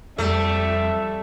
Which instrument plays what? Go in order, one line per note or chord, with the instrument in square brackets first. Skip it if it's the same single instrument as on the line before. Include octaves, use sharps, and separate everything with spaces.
[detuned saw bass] F2 [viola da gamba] G3 [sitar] A3 [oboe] E5